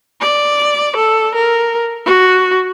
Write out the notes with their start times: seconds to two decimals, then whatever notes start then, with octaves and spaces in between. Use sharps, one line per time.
0.22 D5
0.96 A4
1.35 A#4
2.06 F#4